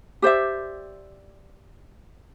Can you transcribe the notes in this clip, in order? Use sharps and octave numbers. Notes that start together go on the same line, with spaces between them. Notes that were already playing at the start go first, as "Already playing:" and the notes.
G4 C5 D5 E5